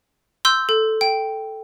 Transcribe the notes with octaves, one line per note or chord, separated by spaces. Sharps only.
C6 E6 G6
A4
G5